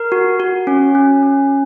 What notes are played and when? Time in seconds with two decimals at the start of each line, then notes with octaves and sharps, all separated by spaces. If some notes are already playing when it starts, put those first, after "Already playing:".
Already playing: A#4
0.12 F#4
0.40 F#4
0.67 C#4
0.95 C#4
1.23 C#4